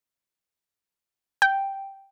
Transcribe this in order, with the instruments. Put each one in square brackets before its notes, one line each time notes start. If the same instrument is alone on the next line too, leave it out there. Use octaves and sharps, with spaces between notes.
[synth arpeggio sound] G5